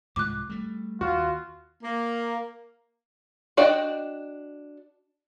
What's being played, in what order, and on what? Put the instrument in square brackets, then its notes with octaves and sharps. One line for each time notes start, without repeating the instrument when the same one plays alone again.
[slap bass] C2 G#2 F3 [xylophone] D6 F#6
[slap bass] G3 A3
[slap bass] D#2 [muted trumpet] F4 [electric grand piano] F#4
[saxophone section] A#3
[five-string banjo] D4 F#4 D5 D#5 G5